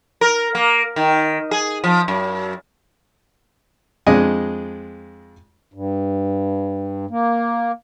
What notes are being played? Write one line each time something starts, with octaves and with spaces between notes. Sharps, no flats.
A#4
A#3
D#3
G#4
F3
F#2
F2 G#3 D4 D#5 G#5
G2
A#3